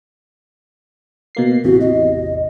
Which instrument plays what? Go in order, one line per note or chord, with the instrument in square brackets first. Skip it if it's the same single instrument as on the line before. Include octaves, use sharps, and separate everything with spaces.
[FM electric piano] B2 A#3 C7
[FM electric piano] A1 E2 C3 [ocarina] F#4
[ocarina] D#5